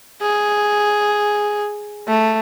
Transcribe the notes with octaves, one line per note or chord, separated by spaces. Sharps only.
G#4
A3